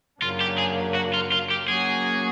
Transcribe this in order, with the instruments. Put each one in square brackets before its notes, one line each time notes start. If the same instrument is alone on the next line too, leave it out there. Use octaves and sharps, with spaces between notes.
[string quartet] F#2 C#3 F#3 A#3 D4 [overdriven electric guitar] F4
[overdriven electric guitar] G4
G#4
F#4
F4
F4
G4
[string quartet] F#3 A#3 C#4 F#4 [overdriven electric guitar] G#4